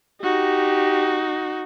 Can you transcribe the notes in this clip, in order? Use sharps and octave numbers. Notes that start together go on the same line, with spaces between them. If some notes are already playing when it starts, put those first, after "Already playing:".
D#4 F#4 G4